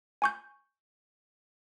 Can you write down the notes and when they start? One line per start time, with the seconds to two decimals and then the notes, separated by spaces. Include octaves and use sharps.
0.22 G#5 C#6 G6